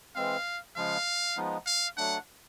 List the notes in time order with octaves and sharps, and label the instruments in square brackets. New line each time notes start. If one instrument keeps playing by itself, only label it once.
[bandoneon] E3 G#3 C4 [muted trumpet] F5
[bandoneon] C#3 F3 G#3 [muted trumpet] F5
[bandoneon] F3 G#3 B3 D#4
[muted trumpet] F5
[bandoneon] F#3 A3 D4 [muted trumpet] F#5